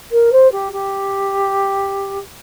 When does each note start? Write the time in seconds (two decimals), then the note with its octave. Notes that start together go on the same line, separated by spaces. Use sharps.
0.12 A#4
0.32 C5
0.52 G4
0.72 G4